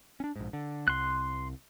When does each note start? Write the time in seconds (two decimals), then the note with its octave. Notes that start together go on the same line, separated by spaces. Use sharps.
0.20 C#4 D4
0.36 A#1 G#2
0.53 D3
0.88 C2 C6 F#6